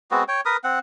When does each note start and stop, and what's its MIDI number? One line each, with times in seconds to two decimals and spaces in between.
0.11 0.24 56
0.11 0.24 59
0.11 0.24 60
0.11 0.24 66
0.28 0.41 73
0.28 0.41 79
0.45 0.57 70
0.45 0.57 71
0.45 0.57 87
0.64 0.79 60
0.64 0.79 78